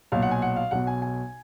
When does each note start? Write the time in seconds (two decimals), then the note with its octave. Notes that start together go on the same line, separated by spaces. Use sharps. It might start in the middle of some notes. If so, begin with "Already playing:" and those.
0.12 B1 A#2 F5
0.22 F#5
0.31 G#5
0.42 F#5
0.56 F5
0.71 B1 B2 F#5
0.87 G#5
1.02 G#5